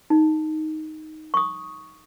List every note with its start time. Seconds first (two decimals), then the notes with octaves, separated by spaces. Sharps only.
0.10 D#4
1.34 C#6 D#6